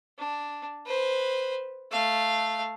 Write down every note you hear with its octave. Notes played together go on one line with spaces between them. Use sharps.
D4
B4 C5
A3 F5